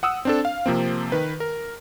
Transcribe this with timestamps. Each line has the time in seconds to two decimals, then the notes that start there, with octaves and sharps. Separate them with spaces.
0.03 F#5 D#6 E6
0.25 C4 D4 A4
0.45 F5
0.66 C3 F3 A#3 C4
1.12 D#3 B4
1.40 A#4